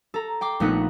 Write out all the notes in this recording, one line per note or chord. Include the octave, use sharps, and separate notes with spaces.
A4 A#5
G5 C6 D6
A#1 A#2 A3 B3 D#4 F#5